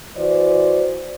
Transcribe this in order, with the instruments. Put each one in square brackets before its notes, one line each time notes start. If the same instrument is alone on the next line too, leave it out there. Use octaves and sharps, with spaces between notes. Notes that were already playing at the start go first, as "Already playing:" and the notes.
[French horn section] E3 F#4 C5 D5